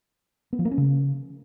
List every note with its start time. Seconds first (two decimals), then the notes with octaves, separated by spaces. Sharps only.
0.53 B3
0.59 F3
0.65 A#3
0.71 C#4
0.78 C#3